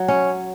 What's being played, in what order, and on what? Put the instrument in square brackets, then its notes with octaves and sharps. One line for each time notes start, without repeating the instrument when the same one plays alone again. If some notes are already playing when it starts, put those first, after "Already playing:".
Already playing: [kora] F#3
C#4